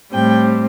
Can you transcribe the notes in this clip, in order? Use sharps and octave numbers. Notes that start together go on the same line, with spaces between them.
A2 G3 C4 G5